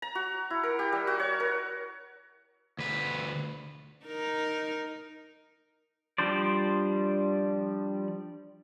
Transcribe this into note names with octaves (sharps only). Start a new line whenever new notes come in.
A#5
F#4
E4
A#4
G4
G3
F#4
C#5
A#4
D2 B4
D#4 A#4
F3 G3 D4 C5 D5